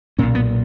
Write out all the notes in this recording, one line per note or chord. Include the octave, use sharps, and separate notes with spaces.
B1 A#2 C#4
B3